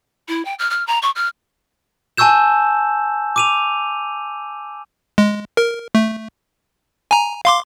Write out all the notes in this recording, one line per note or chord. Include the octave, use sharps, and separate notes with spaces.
E4
G5
F6
F6
A#5
C#6
F6
G#5 A5 C#6 E6 G6 E7
D6 D#7 F7
G#3
A#4
A3
G#5 A#5
F5 C6 D6